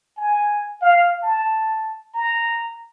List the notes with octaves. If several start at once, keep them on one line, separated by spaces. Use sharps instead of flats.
G#5
F5
A5
A#5